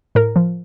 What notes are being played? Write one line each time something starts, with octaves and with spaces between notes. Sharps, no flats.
A2 A#4
F3